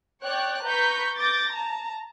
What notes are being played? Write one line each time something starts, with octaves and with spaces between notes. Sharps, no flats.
C#5 D5 G5 F#6
B4 A#5 C#6 G6 B6
D6 G6 A6 A#6
A5 A#5